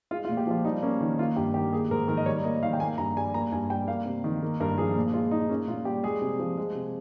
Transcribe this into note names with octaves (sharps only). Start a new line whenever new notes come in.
G#3 F4
F4
A#2
G4
F3 F4
G3 D#4
A#3 C#4
D#3
A#3 F4
G2 G4
D#3 G4
A#3 G#4
G#2 A#4
D#3 A#4
D#5
G3 C#5
A#3 D#5
D#3 F5
G5
A#3 G#5
G2 A#5
G3 G#5
A#3 A#5
G2 G#5
G3 G5
A#3 F5
C3
D#3
A#3
G2 A#4
F3 G#4
A#2
G#3 F4
G#3 D#4
A#3 C#4
A#2 F4
G3 G4
G#3 G#4
C3
F3
G#3
C3